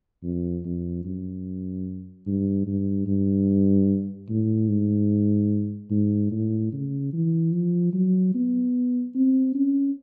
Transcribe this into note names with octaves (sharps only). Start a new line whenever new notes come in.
F2
F2
F#2
G2
G2
G2
A2
G#2
G#2
A2
C#3
E3
F3
F#3
B3
C4
C#4